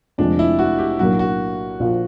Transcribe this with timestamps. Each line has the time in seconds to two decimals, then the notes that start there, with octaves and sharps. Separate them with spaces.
0.18 F1 F2 D3 F3 G#3 D4
0.39 E4
0.59 F#4
0.79 G4
0.99 B1 A2 F#3 A#3 D4 F#4
1.19 F#4
1.79 A#1 A#2 F3